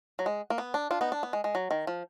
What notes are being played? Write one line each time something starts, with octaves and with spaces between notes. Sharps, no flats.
F#3
G#3
A#3
B3
D4
D4 F4
B3 D#4
D4
B3
G#3
G#3
F#3
D#3
F3